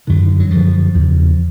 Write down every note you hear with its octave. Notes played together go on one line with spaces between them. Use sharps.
F#2 D3 D#3
F#3
F#2 D3 F3
E2 C#3